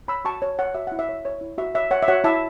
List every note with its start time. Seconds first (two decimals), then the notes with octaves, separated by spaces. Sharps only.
0.08 C#5 B5 E6
0.25 F#4 A5 C#6
0.42 C#5
0.59 C#5 F#5
0.74 F#4 E5
0.87 E4 F#5
0.99 E5
1.09 C#5
1.25 C#5
1.41 E4
1.58 F#4 E5
1.74 C#5 E5
1.91 C#5 F#5
2.03 E5
2.08 F#4 C#5 F#5
2.24 E4 E5 A5